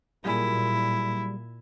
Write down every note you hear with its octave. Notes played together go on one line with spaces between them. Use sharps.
A#2 F#3 G3 E4 G#4